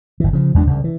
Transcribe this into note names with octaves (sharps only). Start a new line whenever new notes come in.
G1 E3
C#3 F3
E2 G#3 D4
C2 C#3
E3